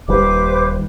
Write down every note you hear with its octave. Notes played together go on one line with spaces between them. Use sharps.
D#1 D#2 G3 B4 C5 D6